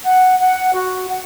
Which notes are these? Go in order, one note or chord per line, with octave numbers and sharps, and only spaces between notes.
F#5
F#5
F#4
F#5